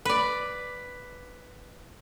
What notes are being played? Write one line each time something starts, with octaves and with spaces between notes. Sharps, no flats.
B4 D5